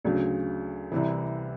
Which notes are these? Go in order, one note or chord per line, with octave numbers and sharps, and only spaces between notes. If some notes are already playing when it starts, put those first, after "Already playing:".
D2 C#3 F#3
C2 C3 E3